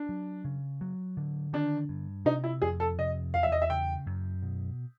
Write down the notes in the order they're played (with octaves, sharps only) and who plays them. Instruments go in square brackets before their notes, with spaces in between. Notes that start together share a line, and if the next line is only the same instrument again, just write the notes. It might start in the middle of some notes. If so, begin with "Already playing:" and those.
Already playing: [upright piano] D4
[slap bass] F#3
C#3
F#3
D3
[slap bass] D#3 [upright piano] D4
[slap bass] G2
[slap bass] C3 [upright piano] D#4
[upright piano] E4
[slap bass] F2 [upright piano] G#4
[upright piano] A4
[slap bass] C3 [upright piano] D#5
[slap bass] E2 [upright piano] F5
[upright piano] E5
D#5
E5
[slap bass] C#3 [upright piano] G5
[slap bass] F#2
B2